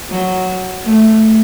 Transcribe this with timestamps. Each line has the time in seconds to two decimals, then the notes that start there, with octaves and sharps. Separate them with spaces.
0.11 F#3
0.86 A3